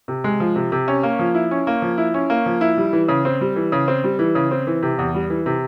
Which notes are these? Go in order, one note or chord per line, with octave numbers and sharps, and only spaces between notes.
C3
G#3
F3
C3
C3
C#4
A#3
F3
E4
C#4
A#3
F3
E4
C#4
A#3
F3
E4
G3
E3
C#3
C4
G3
E3
C#3
C4
G3
E3
C#3
C4
E3
C3
E2
G3
E3
C3